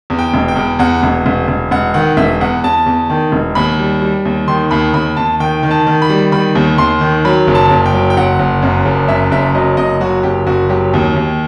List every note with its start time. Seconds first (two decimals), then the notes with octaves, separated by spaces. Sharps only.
0.10 E2
0.19 G5
0.34 E1
0.48 G5
0.56 E2
0.79 E2 F#5
1.03 E1
1.26 E1
1.48 E1
1.71 E1 F#5
1.94 D#3 F#5
2.17 E1 E5
2.41 E2 F#5
2.64 E2 A5
2.86 E2
3.10 D#3
3.32 E1
3.55 D#2 B5
3.79 G3
4.02 G3
4.25 D#2
4.48 D#3 C6
4.71 D#2 B5
4.94 D#2 B5
5.17 D#2 A5
5.40 D#3 G5
5.63 D#3
5.71 A5
5.87 D#3
6.02 B5
6.09 G3
6.32 D#3 B5
6.55 D#2
6.78 D#2 C6
7.01 D#3
7.25 F#3 B5
7.47 F#1
7.55 A5
7.70 F#1
7.86 G5
7.93 F#3
8.10 G5
8.17 F#1 F#5
8.39 F#1
8.62 F#2
8.85 F#1
9.08 F#2 E5
9.31 F#1 E5
9.55 F#3 D#5
9.77 F#1 D#5
10.00 F#3 F#4
10.23 F#1 G4
10.47 F#1 F#4
10.69 F#3 G4
10.94 D#2
11.16 D#2